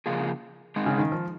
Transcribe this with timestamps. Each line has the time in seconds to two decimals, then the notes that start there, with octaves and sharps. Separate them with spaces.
0.06 C#3 F3 A#3 F4 G#4
0.76 G#3 C4 D#4
0.86 C#3
0.98 D#3
1.12 F3